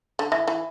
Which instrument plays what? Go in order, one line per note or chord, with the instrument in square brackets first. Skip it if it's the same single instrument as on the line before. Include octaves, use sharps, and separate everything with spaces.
[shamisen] D3
[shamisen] E3 [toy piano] E5
[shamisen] E3